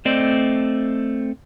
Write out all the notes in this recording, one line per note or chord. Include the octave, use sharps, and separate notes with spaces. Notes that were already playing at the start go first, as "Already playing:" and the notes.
A3 C4 C5 D5 D#5